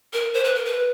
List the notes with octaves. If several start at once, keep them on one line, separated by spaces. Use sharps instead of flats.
A#4
C5
B4
A#4
B4